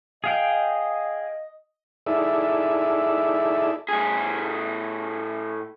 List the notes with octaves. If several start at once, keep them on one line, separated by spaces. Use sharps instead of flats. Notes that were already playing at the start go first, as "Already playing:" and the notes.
G#4 D#5 F5 G5
D#4 E4 G#4 A4 D5 E5
A2 G#4